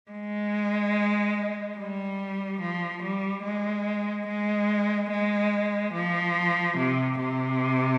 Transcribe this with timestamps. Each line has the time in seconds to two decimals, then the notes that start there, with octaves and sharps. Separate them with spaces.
0.11 G#3
1.78 G3
2.61 F3
3.03 G3
3.44 G#3
4.27 G#3
5.11 G#3
5.94 F3
6.77 C3
7.19 C3